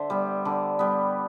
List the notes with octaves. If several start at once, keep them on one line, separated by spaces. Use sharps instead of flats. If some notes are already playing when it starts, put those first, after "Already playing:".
Already playing: D3 C5 E5
G3 B3
D3
G3 B3